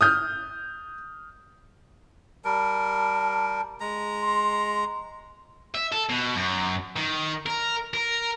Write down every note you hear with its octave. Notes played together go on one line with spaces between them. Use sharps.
D#6 F6 G6
G3 A#4 A5
G#3 A#5
C6
E5
A4
B2
F#2
D#3
A#4
A#4